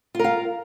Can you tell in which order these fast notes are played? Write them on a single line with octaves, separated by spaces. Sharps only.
F4 A#4 F5